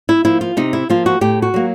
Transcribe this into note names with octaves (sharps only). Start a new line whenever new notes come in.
E4
F3 A#3 E4
F4
C3 D#4
E4
F3 A#3 F4
F#4
A2 G4
F#4
F#3 A#3